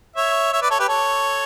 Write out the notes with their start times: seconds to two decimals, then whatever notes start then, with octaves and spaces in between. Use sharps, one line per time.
0.16 C#5 E5
0.53 C#5 E5
0.62 B4 D5
0.70 A4 C#5
0.79 G4 B4
0.88 A4 C#5